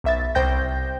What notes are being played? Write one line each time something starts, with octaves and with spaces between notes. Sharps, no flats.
B1 E5 A6
C2 C5 G5 G6 A#6